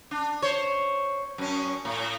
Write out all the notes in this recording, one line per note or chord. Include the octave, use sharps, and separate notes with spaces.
D4
C5 C#5
F#2 C#4
A2